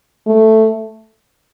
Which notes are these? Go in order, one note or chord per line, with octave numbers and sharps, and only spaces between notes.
A3